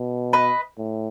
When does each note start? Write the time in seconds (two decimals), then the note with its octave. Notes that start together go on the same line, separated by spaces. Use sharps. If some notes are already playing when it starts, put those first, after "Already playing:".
Already playing: B2
0.33 B4 D#5
0.78 A2